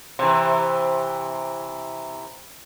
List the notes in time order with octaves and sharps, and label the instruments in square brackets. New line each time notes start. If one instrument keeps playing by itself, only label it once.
[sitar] C3 E3